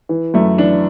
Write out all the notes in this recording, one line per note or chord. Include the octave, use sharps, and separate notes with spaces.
E3
F#2 A3
E3 D4